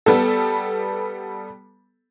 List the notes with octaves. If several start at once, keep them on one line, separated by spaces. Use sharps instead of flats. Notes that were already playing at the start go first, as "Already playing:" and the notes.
G3 B3 A4